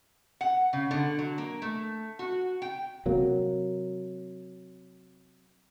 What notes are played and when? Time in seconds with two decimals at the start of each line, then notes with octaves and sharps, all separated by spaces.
0.41 F#5
0.73 C#3
0.91 D3
1.19 F#3
1.38 A#3
1.62 A3
2.19 F#4
2.62 G5
3.06 C3 F#3 A#3